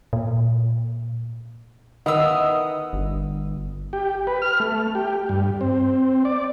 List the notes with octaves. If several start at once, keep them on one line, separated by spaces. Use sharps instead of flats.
A#2
D#3 B3 E4 D#5 F5 D#6 E6
G1
G4
B4
F6
A3
G4
G2
C4
D5